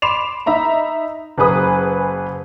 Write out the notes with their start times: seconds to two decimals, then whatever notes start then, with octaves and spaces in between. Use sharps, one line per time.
0.02 B5 C6 D6 C7 E7 F7
0.46 D#4 E5 A#5 B5
1.38 F#1 G#4 B4 D#6